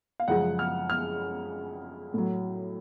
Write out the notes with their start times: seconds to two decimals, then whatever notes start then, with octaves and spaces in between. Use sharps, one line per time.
0.20 F5
0.28 F#2 C#3 F3 G#3 F#5
0.59 F6
0.90 F6
2.14 A2 F#3